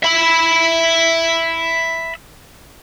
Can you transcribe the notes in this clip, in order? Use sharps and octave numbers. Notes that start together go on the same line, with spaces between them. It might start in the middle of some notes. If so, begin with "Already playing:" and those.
E5 B5